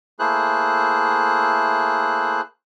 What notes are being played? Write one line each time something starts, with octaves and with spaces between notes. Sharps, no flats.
A3 A#3 E4 G#4 C5 F#6